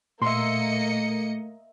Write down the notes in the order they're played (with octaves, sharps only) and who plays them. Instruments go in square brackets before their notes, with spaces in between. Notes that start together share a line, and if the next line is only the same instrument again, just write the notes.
[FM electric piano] A#2 [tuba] A3 [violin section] A#3 D#5 C#7 [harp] E5 C6